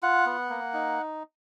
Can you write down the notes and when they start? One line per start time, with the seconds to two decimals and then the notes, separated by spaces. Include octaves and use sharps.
0.03 F4 F#5
0.26 B3
0.50 A#3
0.74 D#4